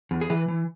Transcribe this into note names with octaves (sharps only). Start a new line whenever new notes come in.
E2
G#4
E3 B4
E3